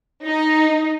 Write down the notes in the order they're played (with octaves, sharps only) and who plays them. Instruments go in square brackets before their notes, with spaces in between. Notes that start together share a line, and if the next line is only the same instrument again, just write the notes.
[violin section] D#4